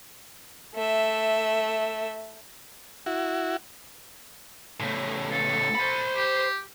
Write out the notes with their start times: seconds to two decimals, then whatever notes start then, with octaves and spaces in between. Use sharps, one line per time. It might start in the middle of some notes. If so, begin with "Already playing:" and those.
0.75 A3 E5
3.06 E4 F#4
4.80 A2 C#3
5.32 A4
5.75 C5 B5
6.16 G4